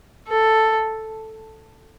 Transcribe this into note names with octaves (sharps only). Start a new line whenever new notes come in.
A4